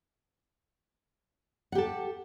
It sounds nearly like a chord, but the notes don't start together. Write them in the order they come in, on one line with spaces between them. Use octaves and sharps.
F#5 G4 A4